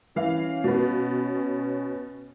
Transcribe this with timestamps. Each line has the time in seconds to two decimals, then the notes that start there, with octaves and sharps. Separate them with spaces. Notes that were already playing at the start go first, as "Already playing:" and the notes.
0.16 E3 C#4 F5
0.64 B2 B3